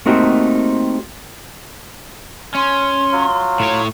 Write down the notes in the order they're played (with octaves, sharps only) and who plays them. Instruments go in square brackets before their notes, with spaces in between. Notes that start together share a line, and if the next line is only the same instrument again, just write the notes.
[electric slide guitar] A3 A#3 C4 D#4 F#4 G4
[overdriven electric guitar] C#4 [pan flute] C6
[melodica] F#3 F4
[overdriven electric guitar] A2 C#5